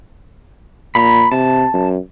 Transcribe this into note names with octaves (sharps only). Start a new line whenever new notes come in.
A#2 A#5 B5
C3 A5
F#2